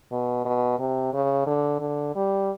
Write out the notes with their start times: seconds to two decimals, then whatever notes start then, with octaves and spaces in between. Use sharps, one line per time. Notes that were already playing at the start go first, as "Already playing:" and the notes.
0.12 B2
0.45 B2
0.79 C3
1.14 C#3
1.47 D3
1.80 D3
2.15 G3